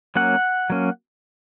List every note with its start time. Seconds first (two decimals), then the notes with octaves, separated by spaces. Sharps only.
0.16 F#3 A#3 C#4 F#5
0.70 F#3 A#3 C#4